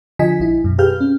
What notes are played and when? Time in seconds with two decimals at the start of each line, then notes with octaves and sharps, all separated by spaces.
0.19 D3 F3 F4 D#5 G#5 B6
0.40 A#1 E4
0.64 F#2 B2
0.78 G4 G#4 B4 F5 F6 G6
1.01 C#4